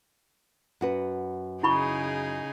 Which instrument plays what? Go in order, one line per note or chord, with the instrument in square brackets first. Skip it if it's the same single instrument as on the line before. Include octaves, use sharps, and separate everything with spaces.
[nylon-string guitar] F#2 F#4 B4
[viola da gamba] C#3 D#4 G#4 [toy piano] E4 B5 C#6